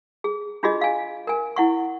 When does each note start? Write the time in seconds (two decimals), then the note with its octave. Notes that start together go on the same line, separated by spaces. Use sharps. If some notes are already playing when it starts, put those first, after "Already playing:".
0.24 G#4
0.63 D4 F4 F#4 G#4 D#5
0.81 F5 G#5
1.27 A#4 G#5
1.56 E4 F#5 C#6